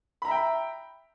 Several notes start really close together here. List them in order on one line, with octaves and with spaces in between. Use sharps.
B5 A#5 E5 G5